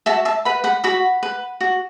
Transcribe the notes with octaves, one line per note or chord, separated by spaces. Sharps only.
F#4 E5 A5
E5 A5
B4 F#5 B5
F#5 B5
F#4 F#5 B5
B4
F#4